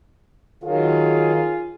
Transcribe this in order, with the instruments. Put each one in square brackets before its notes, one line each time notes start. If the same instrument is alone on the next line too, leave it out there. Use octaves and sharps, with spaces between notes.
[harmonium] D#3 F#3 [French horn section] F4 G#4